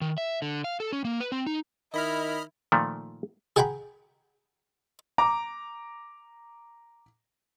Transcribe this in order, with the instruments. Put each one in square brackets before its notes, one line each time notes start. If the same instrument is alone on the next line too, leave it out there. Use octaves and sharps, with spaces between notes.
[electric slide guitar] D#3
E5
D3
F5
A4
C#4
A#3
B4
C4
D#4
[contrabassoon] D#3 [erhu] E4 [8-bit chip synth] D#5 B5 F6
[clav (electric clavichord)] A#2 D#3 F3 A3
[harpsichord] G#4 F#5 G5 A#5 B5
[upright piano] A#5 D6